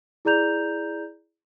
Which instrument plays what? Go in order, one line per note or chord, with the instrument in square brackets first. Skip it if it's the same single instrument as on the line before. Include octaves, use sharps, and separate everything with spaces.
[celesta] E4 G#4 D5 A#5 G6 F7